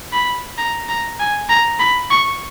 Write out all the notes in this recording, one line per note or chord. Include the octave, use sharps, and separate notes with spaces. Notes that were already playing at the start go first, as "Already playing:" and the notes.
B5
A#5
A#5
G#5
A#5
B5
C#6